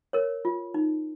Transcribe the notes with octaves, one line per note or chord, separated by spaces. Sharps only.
A#4 C#5
F4
D#4